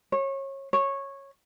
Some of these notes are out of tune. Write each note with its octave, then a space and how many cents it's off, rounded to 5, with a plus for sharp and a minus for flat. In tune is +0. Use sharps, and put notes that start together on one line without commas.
C#5 -25
C#5 -10